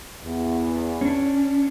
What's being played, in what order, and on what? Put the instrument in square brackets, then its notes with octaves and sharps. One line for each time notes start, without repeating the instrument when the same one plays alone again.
[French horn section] E2
[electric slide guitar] C#4 D4